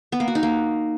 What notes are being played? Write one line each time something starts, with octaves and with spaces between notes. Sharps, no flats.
B3
A#3
F#4
D#4
A#3